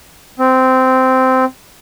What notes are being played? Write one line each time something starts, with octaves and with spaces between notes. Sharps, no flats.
C4